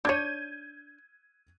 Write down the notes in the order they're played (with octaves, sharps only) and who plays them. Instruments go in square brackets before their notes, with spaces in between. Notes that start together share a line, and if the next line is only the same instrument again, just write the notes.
[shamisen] D4 C#5 [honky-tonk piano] G6 G#6 D#7